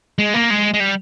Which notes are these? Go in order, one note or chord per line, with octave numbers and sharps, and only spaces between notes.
G#3
A#3
G#3
G#3
G3